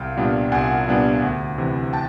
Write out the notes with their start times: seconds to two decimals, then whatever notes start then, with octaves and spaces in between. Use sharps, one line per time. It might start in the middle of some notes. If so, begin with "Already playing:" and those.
Already playing: C2 F5 G5
0.17 A#2 G3 B3 D4
0.52 C2 F#5 G#5
0.88 A#2 G3 B3 D4
1.22 D2
1.58 C3 E3
1.93 G5 A5